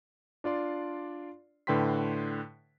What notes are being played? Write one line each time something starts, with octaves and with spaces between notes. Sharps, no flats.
D4 F4 D5 C6
A2 D3 B4 G5 C6 B6